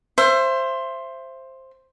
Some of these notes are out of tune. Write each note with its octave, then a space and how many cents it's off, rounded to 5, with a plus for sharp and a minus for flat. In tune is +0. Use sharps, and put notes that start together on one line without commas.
C5 +10 E5 +30